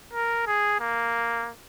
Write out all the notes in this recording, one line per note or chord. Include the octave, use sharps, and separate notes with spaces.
A#4
G#4
A#3